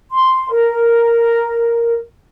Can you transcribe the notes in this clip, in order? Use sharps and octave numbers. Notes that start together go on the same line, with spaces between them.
C6
A#4